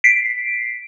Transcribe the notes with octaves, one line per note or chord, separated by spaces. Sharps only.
B6 C7 D7